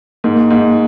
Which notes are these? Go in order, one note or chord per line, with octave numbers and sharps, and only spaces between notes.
G#2 A#3
G#2